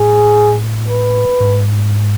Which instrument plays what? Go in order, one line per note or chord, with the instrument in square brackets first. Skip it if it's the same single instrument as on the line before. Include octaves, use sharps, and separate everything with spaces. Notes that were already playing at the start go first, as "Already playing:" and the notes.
Already playing: [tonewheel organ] A2 [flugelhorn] G#4
[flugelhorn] B4
[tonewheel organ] G#2